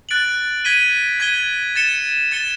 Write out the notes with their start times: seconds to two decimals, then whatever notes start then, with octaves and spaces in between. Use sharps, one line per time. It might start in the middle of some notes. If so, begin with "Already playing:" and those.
0.09 F#6 A6 D7 F#7
0.65 G#6 B6 D#7 G7
1.20 G#6 B6 D#7 G7
1.76 A6 C#7 E7 G7
2.31 A6 C#7 E7 G7